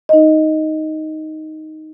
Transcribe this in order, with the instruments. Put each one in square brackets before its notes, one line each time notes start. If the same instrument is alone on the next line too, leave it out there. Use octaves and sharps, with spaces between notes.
[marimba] D#4 D#5